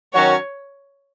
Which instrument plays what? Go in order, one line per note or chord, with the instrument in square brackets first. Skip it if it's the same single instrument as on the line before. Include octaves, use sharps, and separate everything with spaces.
[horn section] D#3 F#3 C#4 F#4 [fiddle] C#5